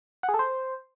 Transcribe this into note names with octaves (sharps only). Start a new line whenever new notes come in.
F#5
G#4
A4
C5